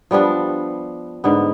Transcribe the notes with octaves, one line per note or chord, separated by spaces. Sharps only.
F3 G3 B3 D4
G#2 D3 B3